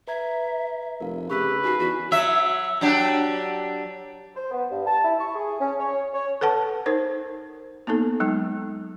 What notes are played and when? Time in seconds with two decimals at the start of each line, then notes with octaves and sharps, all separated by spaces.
0.08 B4 E5 A#5 G#6
1.00 F1 A#4 F5
1.30 C#3 G4 B4 C#6 E6 B6
1.63 D#4 F#4 G#5 C7
1.79 E2 F#4
2.11 F#3 E5
2.81 F#3 D4 G4
4.35 C5
4.51 B3
4.70 G2
4.86 A5
5.03 E4
5.18 C#6
5.34 G#4
5.60 C#4
5.79 C#5
6.13 C#5
6.41 A4 B4 F#5 A5
6.86 D#4 A#4 C5
7.87 A#3 B3 D#4 A4
8.20 F#3 G#3 D#4